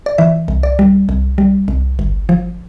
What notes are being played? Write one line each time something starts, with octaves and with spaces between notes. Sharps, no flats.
D5
E3 E5
C2
D5
G3
C2
G3
C2
G1
F3